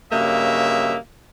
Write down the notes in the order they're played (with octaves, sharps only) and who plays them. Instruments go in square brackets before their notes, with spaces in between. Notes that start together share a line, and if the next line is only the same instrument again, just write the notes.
[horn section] G2 C#3 F#3 A#3 D#5 E5